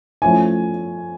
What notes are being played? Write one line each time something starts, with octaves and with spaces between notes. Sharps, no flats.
F3 A3 C#4 E4 G#5